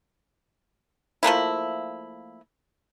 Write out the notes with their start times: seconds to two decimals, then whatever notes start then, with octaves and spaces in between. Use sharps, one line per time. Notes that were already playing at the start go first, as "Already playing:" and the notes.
1.23 F3 A3 A#3 E4